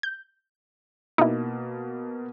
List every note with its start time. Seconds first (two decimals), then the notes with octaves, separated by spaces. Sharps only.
0.03 G6
1.18 B2 A#3 D#4 E4